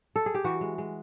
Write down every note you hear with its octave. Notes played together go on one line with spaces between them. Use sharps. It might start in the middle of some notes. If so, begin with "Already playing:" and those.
A4
G#4
G4
E3 F#4
G#3
G#3